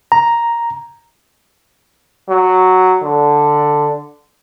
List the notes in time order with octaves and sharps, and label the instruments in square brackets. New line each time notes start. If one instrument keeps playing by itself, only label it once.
[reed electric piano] A#5
[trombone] F#3
D3